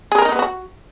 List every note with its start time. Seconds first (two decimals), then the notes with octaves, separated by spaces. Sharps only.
0.12 G#4
0.18 A#4
0.25 D#4
0.32 B3
0.39 F#4